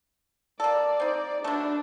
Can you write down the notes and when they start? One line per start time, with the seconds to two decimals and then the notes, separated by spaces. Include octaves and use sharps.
0.60 A#3 A4 D5
1.00 C4 D#4
1.44 B2 A3 D4